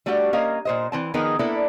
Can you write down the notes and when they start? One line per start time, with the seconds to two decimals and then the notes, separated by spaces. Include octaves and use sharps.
0.06 G3 A3 D4 F#4 G4
0.33 A#3 C#4 A#4 D#5 F5
0.65 A#2 C5 D#5
0.92 E3 C4 A5
1.14 D#3 F3 B3 D#4 G#4 A#4
1.39 A#3 B3 D4 E4 A4